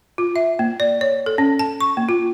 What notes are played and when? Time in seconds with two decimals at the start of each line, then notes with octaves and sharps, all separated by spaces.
0.18 F4
0.36 E5
0.59 A#3
0.80 D5
1.01 C#5
1.26 A4
1.38 C#4
1.59 A5
1.80 C#6
1.97 A#3
2.09 F4